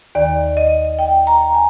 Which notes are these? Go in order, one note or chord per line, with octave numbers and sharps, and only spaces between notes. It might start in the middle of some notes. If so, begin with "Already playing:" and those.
D#2 D#3 D5
D#5
G5
A#5
G#5